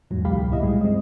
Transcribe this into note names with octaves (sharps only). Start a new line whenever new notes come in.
E2 G#2 F#3
G#1 C#2 B2 G4 F5 B5
C#2 A#2 E4 D#5
G2 G3 G#3
C4 D#5